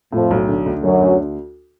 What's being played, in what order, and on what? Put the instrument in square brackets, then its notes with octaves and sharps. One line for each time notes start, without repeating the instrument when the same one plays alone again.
[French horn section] F2 F3 [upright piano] A2
[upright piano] B1
D3
D2
[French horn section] F#2 F#3 [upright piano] D3
[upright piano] D2